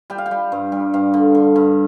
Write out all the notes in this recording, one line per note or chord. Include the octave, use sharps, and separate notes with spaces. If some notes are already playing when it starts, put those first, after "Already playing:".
G3 G5
F5
G5
G3
G2
G3
G2 F5
D3
D3
G2